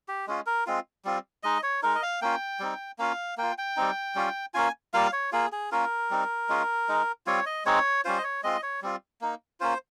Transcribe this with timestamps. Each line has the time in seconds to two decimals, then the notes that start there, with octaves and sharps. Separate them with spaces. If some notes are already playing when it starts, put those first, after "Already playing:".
0.08 G4
0.27 G#3 C#4 F4
0.46 A#4
0.66 G#3 C4 F4
1.05 G3 C4 F4
1.43 G#3 D#4 D#5
1.63 C#5
1.83 G#3 D#4 A#4
1.95 D#5
2.03 F5
2.22 A#3 C#4 F4 G5
2.60 G3 C4 D#4
2.99 A#3 C#4 F4 F5
3.38 A#3 F4 G5
3.58 G5
3.77 G3 C4 D#4
4.15 G3 C#4 F4
4.54 A#3 C#4 F4 G#5
4.94 G3 A#3 F4 F5
5.13 C#5
5.32 A#3 F4 G#4
5.52 G#4
5.72 A#3 C#4 F4 A#4
6.11 G3 C4 D#4
6.49 G#3 C#4 F4
6.89 G#3 D#4
7.26 G3 C4 F4 C#5
7.46 D#5
7.65 G#3 C4 D#4 C#5
8.05 G3 C#4 F4 C5
8.18 D#5
8.24 C#5
8.43 G#3 C4 F4 D#5
8.63 C#5
8.82 G3 C4 F4
9.21 A#3 D#4
9.60 A#3 C#4 F4 C5